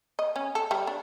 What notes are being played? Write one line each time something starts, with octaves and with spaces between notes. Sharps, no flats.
D#5
C#4
A4
G3
D4